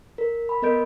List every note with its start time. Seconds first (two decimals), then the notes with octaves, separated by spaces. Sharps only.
0.18 A#4
0.49 B5
0.62 B3 A#4 D#5 G6 D7